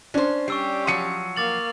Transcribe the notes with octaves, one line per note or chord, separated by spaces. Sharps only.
C#4 D4 C5
G3 C#4 G4 C#6 E6 C7
F3 F#3 C#7 D#7
A#3 D6 F6 A6 F#7